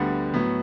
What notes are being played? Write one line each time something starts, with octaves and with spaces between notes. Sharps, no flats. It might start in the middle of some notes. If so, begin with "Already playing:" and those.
Already playing: D2 D3 G3 B3 F#5
A2 F#3 B3